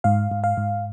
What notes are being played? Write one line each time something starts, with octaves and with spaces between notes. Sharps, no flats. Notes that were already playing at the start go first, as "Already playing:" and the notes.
G#2 F5
G#2
F5
G#2